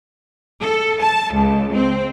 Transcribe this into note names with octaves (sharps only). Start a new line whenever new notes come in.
A4
A5
C#2
C4